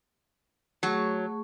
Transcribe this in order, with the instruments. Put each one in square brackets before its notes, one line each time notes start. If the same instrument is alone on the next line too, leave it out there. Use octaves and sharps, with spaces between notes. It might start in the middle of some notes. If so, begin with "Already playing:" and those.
[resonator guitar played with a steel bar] F#3 [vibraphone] A3 G#4 C#6